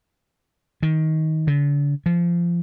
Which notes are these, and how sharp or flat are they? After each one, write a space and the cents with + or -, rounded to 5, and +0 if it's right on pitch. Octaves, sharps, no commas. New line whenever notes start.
D#3 +15
D3 -40
F3 -20